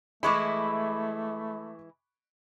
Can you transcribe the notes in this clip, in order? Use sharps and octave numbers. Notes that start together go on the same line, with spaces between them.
E3 G#3 A3 E4 B5 C#6 D6